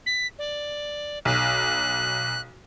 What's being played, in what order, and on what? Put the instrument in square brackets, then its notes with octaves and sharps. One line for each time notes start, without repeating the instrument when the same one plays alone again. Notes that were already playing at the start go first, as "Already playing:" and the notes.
[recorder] B6
D5
[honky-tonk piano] B1 [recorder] F#6